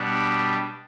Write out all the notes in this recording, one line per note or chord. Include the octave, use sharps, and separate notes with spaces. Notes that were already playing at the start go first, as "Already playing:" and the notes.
Already playing: B2 G3 B3 D4
B5